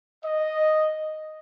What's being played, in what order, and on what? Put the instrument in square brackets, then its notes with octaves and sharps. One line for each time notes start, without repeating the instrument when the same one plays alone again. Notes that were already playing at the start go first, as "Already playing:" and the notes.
[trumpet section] D#5